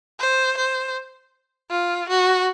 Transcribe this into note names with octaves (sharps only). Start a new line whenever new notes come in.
C5
C5
F4
F#4